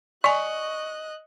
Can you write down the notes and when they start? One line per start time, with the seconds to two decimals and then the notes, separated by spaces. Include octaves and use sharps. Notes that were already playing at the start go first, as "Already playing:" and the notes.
0.24 D5 D#5 G#5 C#6 F#6